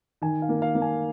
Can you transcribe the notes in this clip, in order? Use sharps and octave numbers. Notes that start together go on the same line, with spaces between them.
D#3 G#5
F5
A#3
F5
A#3
G#5